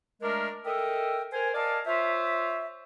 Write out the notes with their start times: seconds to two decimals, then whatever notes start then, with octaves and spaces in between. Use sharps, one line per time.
0.22 G#3 A3 D4 A#4
0.65 A4 A#4 D#5 E5 G5
1.32 A#4 C5 G#5
1.54 A#4 D5 D#5 F5 A5
1.86 F4 C5 C#5 E5